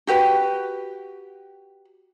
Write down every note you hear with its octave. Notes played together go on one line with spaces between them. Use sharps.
F#4 G4 B4 G5